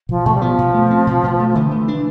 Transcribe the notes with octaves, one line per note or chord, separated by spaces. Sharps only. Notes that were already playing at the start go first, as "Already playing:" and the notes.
B2 F3
B2 A3
G3
F3 B3
B2
A3
C4
B2
B2
A3
F3
D3 E3
A3
D4